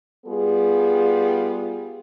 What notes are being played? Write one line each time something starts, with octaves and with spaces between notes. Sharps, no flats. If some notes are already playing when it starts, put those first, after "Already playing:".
G3 B3 F4 G#4